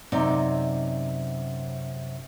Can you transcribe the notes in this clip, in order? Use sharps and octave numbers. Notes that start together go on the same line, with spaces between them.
F#2 C3 D#4 D5